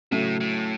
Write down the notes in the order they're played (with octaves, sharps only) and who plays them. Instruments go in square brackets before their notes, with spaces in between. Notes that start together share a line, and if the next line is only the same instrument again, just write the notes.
[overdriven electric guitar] A2 [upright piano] C#3 F#3 A3
[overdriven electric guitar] A2